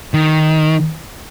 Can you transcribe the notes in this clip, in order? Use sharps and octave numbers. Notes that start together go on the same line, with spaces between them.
D#3